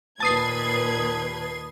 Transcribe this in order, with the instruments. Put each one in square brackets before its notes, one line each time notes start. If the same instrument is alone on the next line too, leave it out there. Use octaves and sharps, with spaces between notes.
[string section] D#2 B4 G#6 [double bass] A#2 [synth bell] A5 D#6 C7